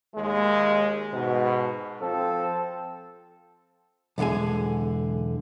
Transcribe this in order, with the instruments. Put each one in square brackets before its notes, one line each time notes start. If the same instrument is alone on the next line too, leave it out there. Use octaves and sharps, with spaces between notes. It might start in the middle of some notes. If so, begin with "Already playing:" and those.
[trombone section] D#2 G#3
G#2 B2
F3 C4 A4
[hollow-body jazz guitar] B1 E2 D3 G#3 G#5